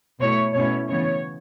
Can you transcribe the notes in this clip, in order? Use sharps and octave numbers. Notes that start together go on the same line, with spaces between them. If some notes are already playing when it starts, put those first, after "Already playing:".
B2 A3 E4 C#5
B2 A3 C#4 E4 C#5
C#3 E3 B3 C#5